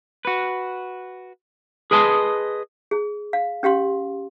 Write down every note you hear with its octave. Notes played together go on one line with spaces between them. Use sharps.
F#4 B4
G#4 B4 D#5 A5 C6
G#4
F5
C#4 G4 F5 C6